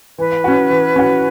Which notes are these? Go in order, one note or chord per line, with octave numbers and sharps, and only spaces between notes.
E3 B4
C#4 F#4
E3
C#4 F#4